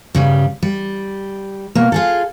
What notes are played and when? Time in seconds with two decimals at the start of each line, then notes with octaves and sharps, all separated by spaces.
0.15 G2 C#3 G3
0.63 G3
1.75 B2 A#3
1.92 F4 G#4 A4